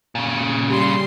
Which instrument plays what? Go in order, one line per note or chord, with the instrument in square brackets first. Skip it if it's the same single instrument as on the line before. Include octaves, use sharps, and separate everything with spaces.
[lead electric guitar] A#2 C#3
[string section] G3 C6